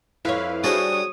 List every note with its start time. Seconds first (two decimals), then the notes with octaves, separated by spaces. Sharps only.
0.25 F2 E4 B4 C#5 F5
0.64 G3 D4 F#4 G#4 C5 C#5 D#6